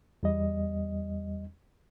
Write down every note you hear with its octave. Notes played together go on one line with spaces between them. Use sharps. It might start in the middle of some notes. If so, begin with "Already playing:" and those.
E2 G3 D#5